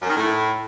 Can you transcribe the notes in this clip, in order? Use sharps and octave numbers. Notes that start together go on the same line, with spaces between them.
F#2
D#3
A2